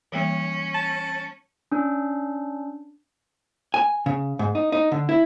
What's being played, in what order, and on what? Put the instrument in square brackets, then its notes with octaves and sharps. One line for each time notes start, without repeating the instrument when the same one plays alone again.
[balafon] E3 G3 A#3 [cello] C#4
[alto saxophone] A5
[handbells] C#4 D4
[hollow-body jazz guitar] G#5
C#3
G#2
D#4
D#4
D3
E4